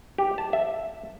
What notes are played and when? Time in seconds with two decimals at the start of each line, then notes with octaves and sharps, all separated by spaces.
0.18 G4
0.38 A5
0.53 E5